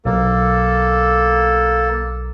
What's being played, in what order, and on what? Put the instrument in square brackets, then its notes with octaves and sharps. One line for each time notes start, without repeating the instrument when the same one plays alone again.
[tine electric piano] B1 [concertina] A#3 [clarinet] A4